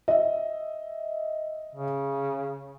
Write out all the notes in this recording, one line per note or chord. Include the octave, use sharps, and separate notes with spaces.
D#5 E5
C#3